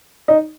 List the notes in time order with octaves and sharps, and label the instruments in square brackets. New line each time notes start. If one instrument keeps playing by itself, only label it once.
[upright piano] D#4